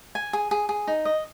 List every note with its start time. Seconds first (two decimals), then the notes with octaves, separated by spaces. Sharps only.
0.15 G#5
0.33 G#4
0.51 G#4
0.69 G#4
0.87 D#4
1.05 D#5